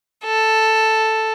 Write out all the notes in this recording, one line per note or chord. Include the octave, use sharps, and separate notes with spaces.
A4